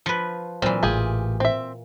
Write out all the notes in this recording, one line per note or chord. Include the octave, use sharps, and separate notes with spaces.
F3 B4
A#2 E3 F#3 C4
A1 F4 G4 G#4
C4 E5